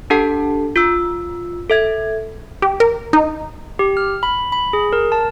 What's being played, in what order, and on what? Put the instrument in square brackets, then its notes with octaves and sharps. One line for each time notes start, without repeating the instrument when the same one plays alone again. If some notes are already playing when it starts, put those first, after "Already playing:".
[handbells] D4 G4 A4 F#5 A5
F4 E6
A4 E5 G#6
[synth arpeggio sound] G4
A#4
D#4
[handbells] G4
F6
B5
B5
G#4
A#4
A5